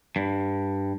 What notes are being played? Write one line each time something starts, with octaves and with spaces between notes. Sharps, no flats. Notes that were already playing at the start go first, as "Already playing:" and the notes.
G2